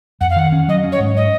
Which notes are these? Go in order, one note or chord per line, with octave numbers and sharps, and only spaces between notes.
F2 F#5
F5
D#3 F#5
C#4
F#3 D#5
C#4
C#5
G#2
D#5